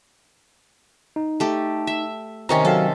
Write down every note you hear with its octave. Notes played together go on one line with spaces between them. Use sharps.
D#4
A3 G4
E5
C3 D#3 C#4 A#5 C#6
F#3 A4 F5